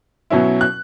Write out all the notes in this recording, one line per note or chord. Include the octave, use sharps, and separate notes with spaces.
B2 F#3 C#4 E4
F#6